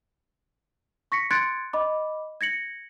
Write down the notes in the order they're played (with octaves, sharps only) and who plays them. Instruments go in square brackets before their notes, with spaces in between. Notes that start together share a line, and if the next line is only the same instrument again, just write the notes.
[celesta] C#6 A#6 B6 C#7
C6 F#6 G#6 A6 C#7 D7
D#5 B5 D6
G#6 A#6 C#7 F#7